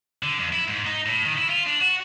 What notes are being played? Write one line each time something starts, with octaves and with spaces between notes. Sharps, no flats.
D3
F2
E4
G#2
D#4
A2
D#3
E4
F4
D4
F#4